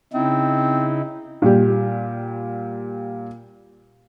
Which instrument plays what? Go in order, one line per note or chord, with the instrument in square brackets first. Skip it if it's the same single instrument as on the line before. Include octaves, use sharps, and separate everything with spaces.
[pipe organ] C#3 D#4 E4 [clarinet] C4
[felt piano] A#2 G3 G4